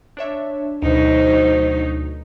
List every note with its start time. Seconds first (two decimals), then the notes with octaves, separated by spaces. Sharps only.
0.17 D4 C#5 E5
0.82 D2 B2 F#3 D#4 C5